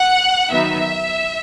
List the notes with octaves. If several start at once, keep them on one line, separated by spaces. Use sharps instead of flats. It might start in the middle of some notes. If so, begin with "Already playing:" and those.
Already playing: F#5
D#3 F#3 B3 D#4 E5